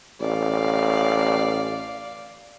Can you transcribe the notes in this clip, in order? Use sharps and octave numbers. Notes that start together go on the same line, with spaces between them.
A1 D5 F5